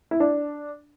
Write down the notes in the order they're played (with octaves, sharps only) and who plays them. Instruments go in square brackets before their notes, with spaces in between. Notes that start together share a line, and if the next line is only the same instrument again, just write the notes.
[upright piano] E4
D4